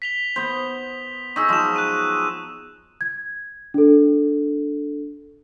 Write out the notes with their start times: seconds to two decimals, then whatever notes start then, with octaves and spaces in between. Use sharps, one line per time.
0.02 B6 F7 G7
0.36 B3 C5
1.36 D#4 G#4 B5 C#6 E6
1.49 F3 F#3 G#3 D#6 E7
1.76 F#6 D#7
3.01 G#6
3.74 D4 A4